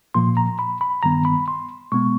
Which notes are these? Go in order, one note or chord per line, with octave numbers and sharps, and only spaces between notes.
A#2 F3 A#3 C6
A#5
B5
B5
G2 D#3 G3 B3 A#5
B5
C6
B2 G#3 B3 C#6